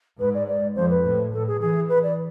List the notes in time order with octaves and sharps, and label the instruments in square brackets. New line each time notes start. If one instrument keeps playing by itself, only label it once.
[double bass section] G#2 [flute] B4
[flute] D5
D5
[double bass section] F2 [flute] C5
[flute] B4
[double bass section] A2
[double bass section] A2 [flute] A4
[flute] G#4
[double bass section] E3 [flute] G#4
[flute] B4
D5